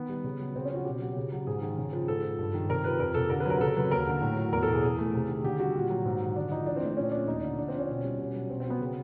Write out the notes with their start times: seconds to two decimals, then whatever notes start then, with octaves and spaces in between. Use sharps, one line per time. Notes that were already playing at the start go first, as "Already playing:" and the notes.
Already playing: D#3 B3
0.09 G3
0.24 C#3
0.39 F#3
0.56 C#3 C4
0.65 C#4
0.71 F3 F#4
0.85 B2 G4
1.01 F#3
1.17 C#3
1.32 F#3
1.47 G#2 G#4
1.62 D#3
1.78 C#3
1.93 F3
2.08 G#2 A4
2.23 F3
2.39 G2
2.54 D#3
2.69 C3 A#4
2.84 F3 B4
2.99 F2 A#4
3.14 C3 A4
3.30 D3 A#4
3.40 B4
3.46 F#3 A#4
3.60 C#3 A4
3.76 F#3 B4
3.91 D#2 A#4
4.07 D3
4.22 A2
4.37 F#3
4.53 E2 A#4
4.63 B2 A4
4.73 G#4
4.83 E3 G#4
4.98 A3
5.14 C3
5.29 D#3
5.44 D3 G4
5.59 G3 F#4
5.75 A#2
5.90 F#3
6.05 G#2
6.20 D#3
6.36 D3 D4
6.51 F3 D#4
6.66 E3 D4
6.76 C4
6.81 A3
6.87 D4
6.97 A#2 C#4
7.12 F3 D4
7.27 D#2 D#4
7.43 D3 D4
7.58 D3 D4
7.68 F3 C4
7.78 C#4
7.89 B2
8.04 G3
8.19 B2
8.35 F#3
8.50 B2 C4
8.60 C4
8.65 F#3
8.70 B3
8.80 C#3